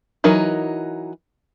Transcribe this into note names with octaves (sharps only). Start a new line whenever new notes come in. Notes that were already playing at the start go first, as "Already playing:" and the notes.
E3 F#3 D#4 A#4